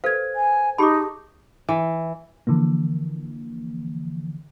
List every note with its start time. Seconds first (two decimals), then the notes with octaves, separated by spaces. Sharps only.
0.04 A4 B4 C5 F5 G#6
0.35 G#5
0.78 D#4 G4 G#4 A5 B5 C#6 D6
1.69 E3
2.47 D3 E3 F3 A#3